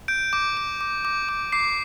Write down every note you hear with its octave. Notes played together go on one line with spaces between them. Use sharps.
G6 D7
D6
D6
D6
D6
D6
D6 C7